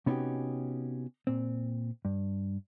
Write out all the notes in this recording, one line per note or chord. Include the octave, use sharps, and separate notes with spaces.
C3 B3 C#4 D#4 F#4 G4
A#2 C4
G2